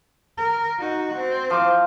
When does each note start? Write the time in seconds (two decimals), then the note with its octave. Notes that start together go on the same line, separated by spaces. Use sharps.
0.38 A#4
0.79 D#4 F#4
1.16 C4
1.50 F3 D6